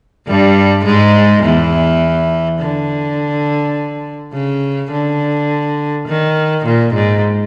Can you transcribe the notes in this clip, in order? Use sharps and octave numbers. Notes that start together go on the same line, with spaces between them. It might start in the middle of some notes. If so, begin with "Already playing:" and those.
G2 G3
G#2 G#3
E2 E3
D3
C#3
D3
D#3
A#2
G#2